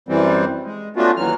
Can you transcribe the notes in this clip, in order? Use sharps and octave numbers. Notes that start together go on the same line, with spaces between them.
F#2 E3 G3 C4
G#3
A3 B3 C#4 D4 F4 F#4
D#2 E3 F#3 F6